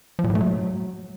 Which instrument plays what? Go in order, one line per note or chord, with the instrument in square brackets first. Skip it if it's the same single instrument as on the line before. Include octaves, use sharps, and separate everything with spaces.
[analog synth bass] F3
A#2
A2
A3
F#3